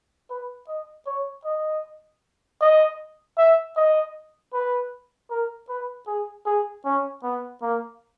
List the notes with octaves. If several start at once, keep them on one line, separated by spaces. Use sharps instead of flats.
B4
D#5
C#5
D#5
D#5
E5
D#5
B4
A#4
B4
G#4
G#4
C#4
B3
A#3